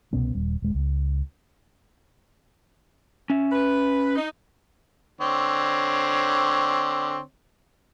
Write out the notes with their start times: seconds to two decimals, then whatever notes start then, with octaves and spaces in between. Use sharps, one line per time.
0.13 C2 B2 B3 C#4
0.35 D#1 G3
0.62 D#1 G#3
0.75 C#2
3.30 C#4 E5
3.52 B4
4.16 D#4
5.21 D3 C4 C#5